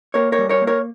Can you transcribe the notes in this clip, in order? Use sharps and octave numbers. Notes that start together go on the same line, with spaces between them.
A#3 A#4 C#5
A#4 C#5
G3
A#4 C#5
A#3
A#4 C#5